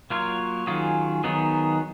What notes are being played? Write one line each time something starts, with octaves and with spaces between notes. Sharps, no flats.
F#3 A#3 F4 A#4 C#5
D#3 F#3 C#4 F4 G#4
D#3 F#3 B3 D#4 G#4